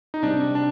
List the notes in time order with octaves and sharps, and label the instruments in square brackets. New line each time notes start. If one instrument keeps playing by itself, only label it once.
[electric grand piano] D#4
[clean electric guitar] C3 G3 C4 [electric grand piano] D4
[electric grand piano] D4